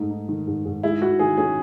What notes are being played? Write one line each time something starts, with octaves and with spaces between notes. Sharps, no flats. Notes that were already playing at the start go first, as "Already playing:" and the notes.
Already playing: G#2 A3 D#4
D#4
D#3
G#2
G#2
G#3 E4
E4 F#4
D#3 G#4
C#4 G#4